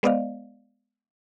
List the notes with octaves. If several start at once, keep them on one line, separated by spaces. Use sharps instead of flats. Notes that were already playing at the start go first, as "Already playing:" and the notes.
G#3 B3 C5 D5 D#5 F5